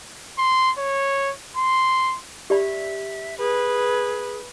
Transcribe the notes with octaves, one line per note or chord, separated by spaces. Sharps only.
C6
C#5
C6
G4 D5 E5 B5
G#4 B4